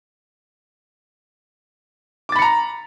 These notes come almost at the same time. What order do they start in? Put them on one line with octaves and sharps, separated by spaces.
D6 A6 B5 C#7 A#5